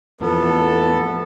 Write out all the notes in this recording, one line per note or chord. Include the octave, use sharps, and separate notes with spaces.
E2 A2 F3 B3 A4